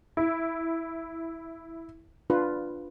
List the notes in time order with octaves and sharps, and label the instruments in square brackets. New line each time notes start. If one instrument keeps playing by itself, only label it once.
[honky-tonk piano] E4
[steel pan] D4 F4 B4